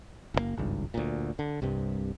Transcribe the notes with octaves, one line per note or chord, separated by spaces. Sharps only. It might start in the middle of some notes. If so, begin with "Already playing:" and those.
F#1 C#3 A#3
G#1 C#2 G2
D2 A#2
D3
C2 G2 C3